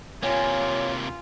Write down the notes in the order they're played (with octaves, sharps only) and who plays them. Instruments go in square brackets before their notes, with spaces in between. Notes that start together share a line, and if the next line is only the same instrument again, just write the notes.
[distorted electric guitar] C3 A#3 [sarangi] F4 [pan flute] C#5 [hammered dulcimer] G#5